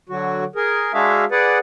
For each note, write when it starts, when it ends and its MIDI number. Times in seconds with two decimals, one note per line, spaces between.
0.09 0.44 50
0.09 0.44 54
0.09 0.44 66
0.56 0.92 68
0.56 0.92 70
0.93 1.25 56
0.93 1.25 62
0.93 1.25 66
0.93 1.25 68
0.93 1.25 76
0.93 1.25 77
1.31 1.58 68
1.31 1.58 71
1.31 1.58 74
1.31 1.58 78